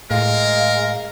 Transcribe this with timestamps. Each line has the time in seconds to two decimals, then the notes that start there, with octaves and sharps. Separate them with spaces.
0.11 A2 G#3 A#4 F5